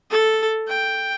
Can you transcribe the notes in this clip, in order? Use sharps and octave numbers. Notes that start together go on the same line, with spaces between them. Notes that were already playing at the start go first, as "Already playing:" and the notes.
A4
G5